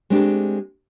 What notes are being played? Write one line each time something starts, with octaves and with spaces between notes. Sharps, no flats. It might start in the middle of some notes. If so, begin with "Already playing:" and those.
G#3 A3 C4 D4 G4